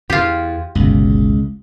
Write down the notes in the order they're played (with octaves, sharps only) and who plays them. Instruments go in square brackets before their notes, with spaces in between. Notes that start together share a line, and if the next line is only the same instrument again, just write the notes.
[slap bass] E2 [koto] F4 G4
[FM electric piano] G1 B2 [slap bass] C#2